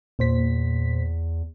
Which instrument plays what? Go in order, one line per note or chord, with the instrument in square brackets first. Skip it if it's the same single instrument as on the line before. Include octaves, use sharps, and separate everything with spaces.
[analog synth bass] E2 [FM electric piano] A#2 C5 B6